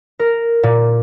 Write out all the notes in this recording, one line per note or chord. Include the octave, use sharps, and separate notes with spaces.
A#4
A#2